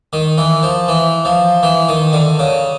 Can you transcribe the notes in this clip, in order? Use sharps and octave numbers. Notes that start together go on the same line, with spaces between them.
D#3
E3
F3
E3
F3
E3
D#3
D3
C#3